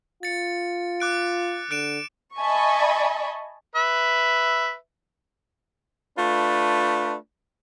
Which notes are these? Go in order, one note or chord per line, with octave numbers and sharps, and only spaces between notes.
F4 A6 C#7
D6 F#6 D7
D3 F#6 D7 E7
D#5 E5 G#5 A5 B5 C#6
B4 E5
A3 D4 F4 B4